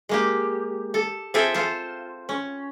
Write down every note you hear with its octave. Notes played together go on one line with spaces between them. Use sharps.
G#3 A#3 G4
A4
C4 F4 G#4 A4 E5 G5
F4 A4 C5
C#4